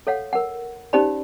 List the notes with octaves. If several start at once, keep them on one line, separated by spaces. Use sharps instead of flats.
A4 C#5 F5 F#5
A#4 F#5
C#4 D#4 G4 C5 D5 B5